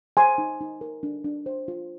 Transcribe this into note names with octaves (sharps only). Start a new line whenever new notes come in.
C5 G#5 C6
D#4
D#4
A#4
D4
D4
C5
F4